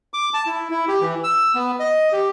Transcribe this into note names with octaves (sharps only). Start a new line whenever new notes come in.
D6
A5
E4
E4
G4
E3
E6
B3
D#5
G4